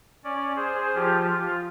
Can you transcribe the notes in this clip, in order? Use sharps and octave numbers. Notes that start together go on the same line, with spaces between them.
C#4 D5
G#4 C5
F3 F4 G4
F4